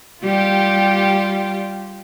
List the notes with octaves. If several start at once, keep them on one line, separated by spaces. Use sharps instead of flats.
G3 F4 G4